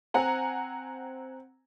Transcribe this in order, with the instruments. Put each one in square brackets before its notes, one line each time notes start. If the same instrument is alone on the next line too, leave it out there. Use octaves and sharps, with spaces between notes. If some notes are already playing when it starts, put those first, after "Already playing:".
[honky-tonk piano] C4 F#5 G#5 A#5